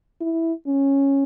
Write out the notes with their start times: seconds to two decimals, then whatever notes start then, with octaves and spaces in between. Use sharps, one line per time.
0.21 E4
0.67 C#4